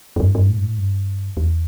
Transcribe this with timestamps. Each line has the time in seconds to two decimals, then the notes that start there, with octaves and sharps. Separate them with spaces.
0.16 F#2
0.20 G2
0.35 G2
0.49 A2
0.57 G2
0.64 A2
0.78 G2
1.37 E2